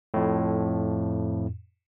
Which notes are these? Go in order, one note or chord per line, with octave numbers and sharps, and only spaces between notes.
F2 A2